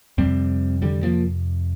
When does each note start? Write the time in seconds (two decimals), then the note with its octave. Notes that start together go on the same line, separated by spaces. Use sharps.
0.18 F2 C3 G3 C4
0.82 D3 G3
1.03 F3 A#3